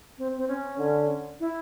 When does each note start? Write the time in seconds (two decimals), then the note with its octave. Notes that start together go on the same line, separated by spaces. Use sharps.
0.18 C4
0.37 C4
0.48 C#4
0.79 D3 C#4
1.40 E4